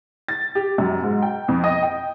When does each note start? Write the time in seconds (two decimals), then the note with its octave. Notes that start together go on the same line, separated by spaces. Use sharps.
0.28 A6
0.55 G4
0.78 F#2
1.03 G#2
1.22 G5
1.48 F2
1.64 D#5
1.82 G5